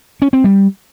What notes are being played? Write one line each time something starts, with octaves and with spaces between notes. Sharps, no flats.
C#4
C4
G3